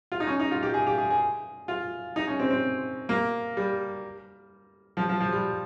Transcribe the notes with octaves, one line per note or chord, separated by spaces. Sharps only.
F4
D#4
C#4
D#4
F4
G4
G#4
G4
G#4
G#4
F4
D#4
C#4
C4
C4
A#3
G3
F3
F3
F3
G3